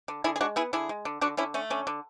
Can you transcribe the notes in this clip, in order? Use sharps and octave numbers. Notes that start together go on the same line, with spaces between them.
D3
D3 E4 G#4
G#4
G#3 D4 F#4
B3 E4 G#4
D3 E4 G#4
G#3
D3
D3 D4 F#4
D3 C#4 E4
A3 C#4
D3 C#4
D3